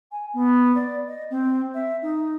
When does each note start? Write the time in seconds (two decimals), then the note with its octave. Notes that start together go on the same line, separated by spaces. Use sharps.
0.11 G#5
0.33 B3
0.75 D5
1.07 D#5
1.30 C4
1.74 E5
2.02 D#4